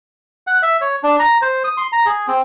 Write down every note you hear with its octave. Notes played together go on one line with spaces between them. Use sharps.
F#5
E5
C#5
D4
A#5
C5
D#6
C6
A#5
G#4
C4